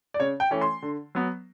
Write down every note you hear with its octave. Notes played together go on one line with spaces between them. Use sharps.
D5
C#3 C#5
G5
E3 A3 C#4
C6
D3
F#3 B3